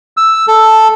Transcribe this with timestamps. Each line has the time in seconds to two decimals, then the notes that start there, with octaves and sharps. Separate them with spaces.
0.17 E6
0.48 A4